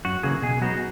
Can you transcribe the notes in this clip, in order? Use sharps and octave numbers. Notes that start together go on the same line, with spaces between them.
F#2 F#4
C#3 E3 A#3 G#4
B2 G#4
F#3 B3 D#4 F#4